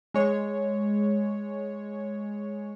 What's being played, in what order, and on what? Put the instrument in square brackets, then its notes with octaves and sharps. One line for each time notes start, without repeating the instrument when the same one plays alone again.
[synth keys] G#3 C#5